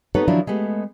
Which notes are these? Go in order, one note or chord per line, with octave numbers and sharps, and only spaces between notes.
B3 D#4 G4 A4 B4 C#5
D#3 F3 F#3 D4 E4 F4
G#3 A3 B3 G4